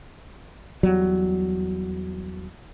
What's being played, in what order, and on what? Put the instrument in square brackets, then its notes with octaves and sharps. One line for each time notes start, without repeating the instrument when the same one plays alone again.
[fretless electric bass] E2 F#3 G3